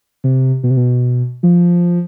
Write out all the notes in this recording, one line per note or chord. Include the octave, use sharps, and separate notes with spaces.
C3
B2
C3
B2
F3